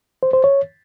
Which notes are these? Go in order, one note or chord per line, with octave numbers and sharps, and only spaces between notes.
C5
C5
C#5